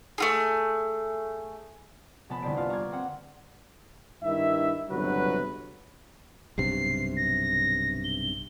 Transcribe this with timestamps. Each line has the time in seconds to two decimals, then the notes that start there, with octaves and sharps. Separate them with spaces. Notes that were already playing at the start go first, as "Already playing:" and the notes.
0.18 A3 F4 G#4
2.29 F1 B3 A5 B5 B6
2.42 G1 C2 C5 D5 B6 D7
2.56 A#3 B3 F4 F5
2.70 A#5 C#6 D6 G#6
2.92 C4 A#4 F#5
4.23 G2 D#3 E4 E5
4.90 G1 C#2 C3 F#3 F#4 B4
6.58 B1 G2 C3 C7
7.16 A#6
8.04 G7